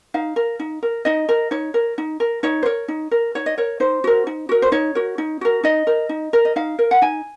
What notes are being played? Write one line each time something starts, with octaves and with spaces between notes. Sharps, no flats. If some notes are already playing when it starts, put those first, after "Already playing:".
D#4 F5
A#4
D#4
A#4
D#4 D#5
A#4
D#4 C#5
A#4
D#4
A#4
D#4 C#5
C5
A#4 C#5
D#4
A#4
D#4 C#5
D#5
A#4 C#5
D#4 C5
F#4 A#4
D#4
F#4 A#4
C5
D#4 C#5
F#4 A#4
D#4
F#4 A#4
D#4 D#5
A#4
D#4
A#4
D#5
D#4 F5
A#4
F#5
D#4 G#5